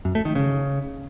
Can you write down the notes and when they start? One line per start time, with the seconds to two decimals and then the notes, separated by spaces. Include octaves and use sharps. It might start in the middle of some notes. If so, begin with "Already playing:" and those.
0.05 F#2
0.15 A3
0.25 D#3
0.35 C#3